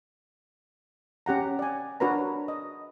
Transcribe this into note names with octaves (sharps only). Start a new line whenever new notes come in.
C#4 G4 F#5 A#5
D5 G#5
D4 F#4 A#4 B4 C#5 A#5
D#5